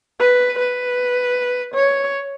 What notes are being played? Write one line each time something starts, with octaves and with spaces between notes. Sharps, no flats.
B4
B4
C#5